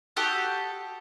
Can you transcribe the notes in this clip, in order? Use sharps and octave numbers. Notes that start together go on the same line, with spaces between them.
F#4 G4 A4 D#6